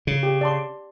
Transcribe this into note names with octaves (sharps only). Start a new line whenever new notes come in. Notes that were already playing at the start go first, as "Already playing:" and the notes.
C#3
G4
D5 A5 C6